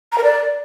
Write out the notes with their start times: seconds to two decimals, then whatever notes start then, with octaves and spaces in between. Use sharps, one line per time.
0.12 A#5
0.18 A#4
0.24 D5